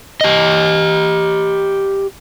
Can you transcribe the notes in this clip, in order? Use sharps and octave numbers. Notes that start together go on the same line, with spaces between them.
G4 D#5